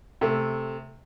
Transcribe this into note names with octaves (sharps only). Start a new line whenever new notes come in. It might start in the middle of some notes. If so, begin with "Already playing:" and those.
C3 A3